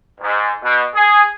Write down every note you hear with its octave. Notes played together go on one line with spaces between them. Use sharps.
G#2
B2
G#4